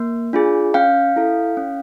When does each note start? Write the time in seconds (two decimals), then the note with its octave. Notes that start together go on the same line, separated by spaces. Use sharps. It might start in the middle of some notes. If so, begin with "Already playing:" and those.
Already playing: A#3
0.33 D4 F4 G#4
0.74 C#4 F5 G5
1.16 E4 A4
1.57 C#4